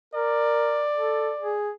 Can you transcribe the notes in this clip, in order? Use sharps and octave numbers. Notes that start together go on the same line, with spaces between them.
A#4 D5
A4
G#4